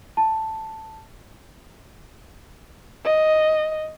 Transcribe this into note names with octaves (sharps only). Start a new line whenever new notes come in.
A5
D#5